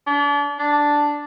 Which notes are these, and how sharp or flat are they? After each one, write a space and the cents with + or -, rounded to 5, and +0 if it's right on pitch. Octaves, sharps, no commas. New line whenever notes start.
D4 -35
D4 +0